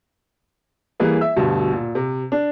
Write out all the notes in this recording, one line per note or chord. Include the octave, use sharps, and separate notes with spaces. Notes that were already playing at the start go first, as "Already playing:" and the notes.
E3 G3 A#3 G#4 B4
E5 E6
D2 G2 B2
A#2
C3
D4